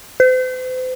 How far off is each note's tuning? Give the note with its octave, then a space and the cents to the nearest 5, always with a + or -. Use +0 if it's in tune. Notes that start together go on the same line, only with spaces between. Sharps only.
C5 -40